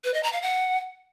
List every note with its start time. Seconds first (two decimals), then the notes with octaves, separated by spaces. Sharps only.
0.04 B4
0.14 D#5
0.23 A#5
0.33 F5
0.42 F#5